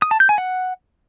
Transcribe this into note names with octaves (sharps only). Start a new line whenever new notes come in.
D#6
A5
G6
G#5
F#5